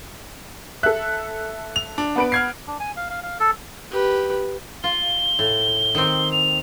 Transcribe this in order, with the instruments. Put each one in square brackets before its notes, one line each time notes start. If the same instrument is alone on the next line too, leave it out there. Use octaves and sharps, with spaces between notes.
[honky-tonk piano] A4 E5 [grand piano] F#6
[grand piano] F7
D4
[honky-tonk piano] B3 B4 D7
[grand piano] F6 G#6 C7
[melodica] D4
G#5
F5
F5
F5
A4
[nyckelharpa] G4 B4
[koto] F4 [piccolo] G7
[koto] A2
D#3 C4
[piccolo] F7